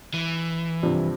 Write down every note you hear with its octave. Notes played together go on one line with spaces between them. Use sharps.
E3
G2 C3 F3